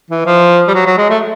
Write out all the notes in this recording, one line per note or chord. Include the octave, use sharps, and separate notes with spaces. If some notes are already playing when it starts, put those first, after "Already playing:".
E3
F3
G3
F#3
F#3
G#3
A3